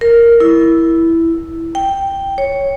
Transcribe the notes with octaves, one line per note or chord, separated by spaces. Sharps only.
A#4
E4
G5
C#5